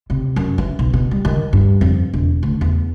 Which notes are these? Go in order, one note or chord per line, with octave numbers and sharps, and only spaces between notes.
C3
F#2
E3
B1
B2
G3
D#3
G2
F2
E1
D2
E2